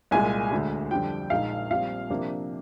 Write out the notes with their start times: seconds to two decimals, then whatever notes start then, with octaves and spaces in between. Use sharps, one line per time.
0.11 C2 A#2 G#3 G#5
0.51 D2 D3 G#3
0.91 F2 D3 G3 D4 G5
1.30 A#1 A#2 G#3 D#4 F5
1.70 A#1 A#2 G3 C4 F5
2.10 C3 F3 A#3 D4